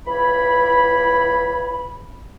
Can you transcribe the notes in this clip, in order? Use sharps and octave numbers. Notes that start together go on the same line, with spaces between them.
C#2 E3 E4 B5